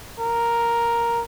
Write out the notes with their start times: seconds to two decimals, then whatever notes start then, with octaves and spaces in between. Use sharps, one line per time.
0.20 A#4